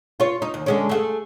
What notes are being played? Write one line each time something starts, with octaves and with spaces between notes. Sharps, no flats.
F4 C#5
D#4
D#2
D3 G#3 C#4
A3 F4 G#4